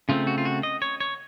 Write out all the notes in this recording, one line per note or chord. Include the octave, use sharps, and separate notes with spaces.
C#3 A3 C4 F4
F#4
F4
F#4
D#5
C#5
C#5